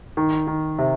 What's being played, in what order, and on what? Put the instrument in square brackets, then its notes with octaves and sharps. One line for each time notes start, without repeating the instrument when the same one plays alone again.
[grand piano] D#3
D#3
C3